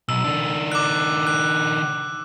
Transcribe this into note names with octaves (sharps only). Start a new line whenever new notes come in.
B1 E6
D#3 D4
D6 F#6
F#6